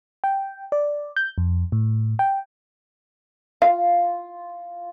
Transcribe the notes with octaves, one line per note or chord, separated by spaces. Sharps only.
G5
D5
G6
F2
A2
G5
F4 F5